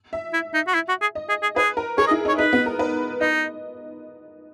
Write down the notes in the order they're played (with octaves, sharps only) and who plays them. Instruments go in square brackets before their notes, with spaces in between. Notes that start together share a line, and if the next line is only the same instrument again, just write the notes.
[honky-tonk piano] E5
[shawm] E4
D#4
F#4
E4
F#4
G#4
[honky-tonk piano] D#5
[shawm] G#4
G#4
[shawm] G#4 [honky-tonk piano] B4
[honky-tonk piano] A#4
[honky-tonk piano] G#4 [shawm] C#5
[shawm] D#5
[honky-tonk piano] E4
D#4
[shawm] C#5
[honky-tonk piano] D#4 [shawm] B4
[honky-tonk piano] B3
A#4
B4
[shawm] D#4 [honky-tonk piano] D#5